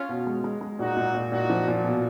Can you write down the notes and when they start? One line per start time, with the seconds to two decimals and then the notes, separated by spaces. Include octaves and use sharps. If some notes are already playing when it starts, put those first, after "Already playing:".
Already playing: C#4 F4
0.09 B2
0.27 G#3
0.44 G#3
0.61 G#3
0.79 A#2 D#4 F#4
0.97 A#2
1.15 A#2
1.32 A#2 D#4 F#4
1.50 F3
1.68 A#2
1.84 B2